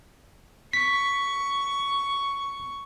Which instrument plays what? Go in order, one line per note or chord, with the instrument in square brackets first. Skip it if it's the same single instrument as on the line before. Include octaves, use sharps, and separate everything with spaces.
[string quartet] C#6 [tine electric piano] B6